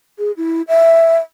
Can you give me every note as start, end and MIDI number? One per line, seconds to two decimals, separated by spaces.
0.19 0.32 68
0.37 0.62 64
0.68 1.17 76